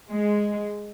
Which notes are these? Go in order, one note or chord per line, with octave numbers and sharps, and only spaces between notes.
G#3